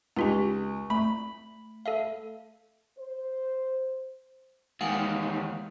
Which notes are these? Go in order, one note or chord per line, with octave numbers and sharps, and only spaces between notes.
C#2 D#4 F4 G4
A3 B5
A4 E5 F5
C5
E2 D#3 G#3 F5 F#5